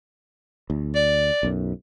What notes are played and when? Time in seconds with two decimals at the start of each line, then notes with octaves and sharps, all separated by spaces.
0.70 D2
0.95 D5
1.43 B1 F#2